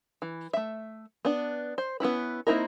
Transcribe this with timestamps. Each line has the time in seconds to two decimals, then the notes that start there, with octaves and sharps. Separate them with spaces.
0.22 E3
0.53 A3 E5
1.25 B3 D4
1.78 C5
2.00 B3 C#4 E4 B4
2.47 A#3 C4 D#4 E4 A#4